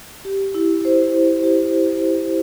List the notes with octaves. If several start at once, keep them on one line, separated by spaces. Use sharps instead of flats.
G4
E4
C5
E4
G4